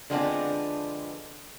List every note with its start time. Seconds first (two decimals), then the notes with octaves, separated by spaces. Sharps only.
0.10 D3 F3 G#3 B3 C4 D4